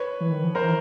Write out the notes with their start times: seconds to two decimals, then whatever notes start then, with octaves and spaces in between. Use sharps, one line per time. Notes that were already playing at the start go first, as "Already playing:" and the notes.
Already playing: B4 C#5
0.20 E3
0.32 D#3
0.44 F3
0.55 F3 A#4 C5
0.63 E3